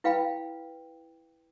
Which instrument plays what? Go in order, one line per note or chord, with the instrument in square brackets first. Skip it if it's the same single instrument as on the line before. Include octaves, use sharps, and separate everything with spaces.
[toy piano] E4 B4 F5 G5 B5